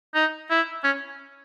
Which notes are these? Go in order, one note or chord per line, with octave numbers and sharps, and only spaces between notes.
D#4
E4
C#4